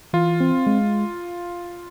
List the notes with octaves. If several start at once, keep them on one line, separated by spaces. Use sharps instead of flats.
E3 F4
C4
G#3